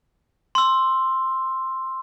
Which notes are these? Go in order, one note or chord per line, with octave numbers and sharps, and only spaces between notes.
C6 E6